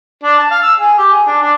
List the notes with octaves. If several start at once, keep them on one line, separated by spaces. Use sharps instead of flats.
D4
A5
F5
E6
G#4
G4
G#4
D4
D4